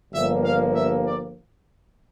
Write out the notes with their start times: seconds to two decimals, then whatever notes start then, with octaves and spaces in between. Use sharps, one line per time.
0.12 G1 G2 F3 A#3 E5
0.43 F5
0.74 E5
1.04 D5